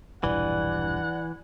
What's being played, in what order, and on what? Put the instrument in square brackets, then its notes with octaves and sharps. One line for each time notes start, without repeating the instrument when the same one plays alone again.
[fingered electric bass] E1 A#1 G2 [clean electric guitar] E3 [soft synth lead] D5 [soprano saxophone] F#5